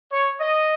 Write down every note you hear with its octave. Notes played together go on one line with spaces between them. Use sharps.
C#5
D#5